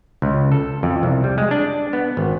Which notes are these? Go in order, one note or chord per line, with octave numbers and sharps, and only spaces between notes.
C#2
A4
F2
C2
G3
G#3
D4
B3
G#1